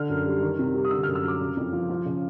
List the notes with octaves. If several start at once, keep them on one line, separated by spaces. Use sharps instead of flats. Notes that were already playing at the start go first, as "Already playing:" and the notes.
Already playing: D3 F6
F#2
G3
D#3
C3
G3
D#6
D3 E6
F6
F#2
E6
F#3 D6
C#3
F2
F3
F3
C#3